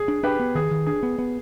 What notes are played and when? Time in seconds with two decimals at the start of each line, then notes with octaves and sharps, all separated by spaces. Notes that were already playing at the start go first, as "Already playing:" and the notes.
Already playing: G#4
0.08 D4
0.23 D4 G4 B4
0.40 B3
0.55 D#3 G#4
0.71 D#3
0.87 D4 G#4
1.03 B3
1.19 B3